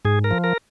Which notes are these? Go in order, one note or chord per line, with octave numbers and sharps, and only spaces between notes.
G#2 G#4
A#4
F3
A#4